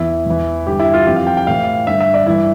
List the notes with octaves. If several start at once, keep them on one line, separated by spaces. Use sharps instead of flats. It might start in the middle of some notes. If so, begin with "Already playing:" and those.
Already playing: E2 E3 E4
E2 E3
G2 D3 G4
E4
F4
F2 E3 G4
F5
G5
G5
A2 E3 F5
G2 D3 E5
E5
D5
G2 E3 E4